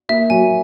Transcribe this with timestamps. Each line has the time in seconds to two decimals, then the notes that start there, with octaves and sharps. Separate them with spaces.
0.09 A#3 E5
0.30 F#3 G#5